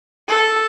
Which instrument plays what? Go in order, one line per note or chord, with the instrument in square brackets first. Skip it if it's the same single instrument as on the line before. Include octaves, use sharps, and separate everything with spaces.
[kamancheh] A4